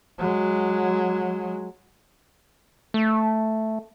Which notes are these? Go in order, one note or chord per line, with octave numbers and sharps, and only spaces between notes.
F#3 G#3
A3